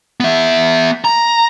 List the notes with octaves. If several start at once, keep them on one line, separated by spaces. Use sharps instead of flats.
B3 E5
A#5